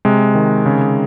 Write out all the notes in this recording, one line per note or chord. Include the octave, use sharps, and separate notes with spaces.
C3 G#3
D#3
C#3